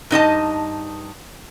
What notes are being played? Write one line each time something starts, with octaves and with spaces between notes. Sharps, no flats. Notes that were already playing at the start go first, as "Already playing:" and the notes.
G2 D#4 D#5 A5